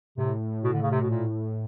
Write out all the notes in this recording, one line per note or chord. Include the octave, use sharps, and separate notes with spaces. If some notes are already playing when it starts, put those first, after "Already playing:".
A2 C3
B2
D3
C#3
C3
B2
A#2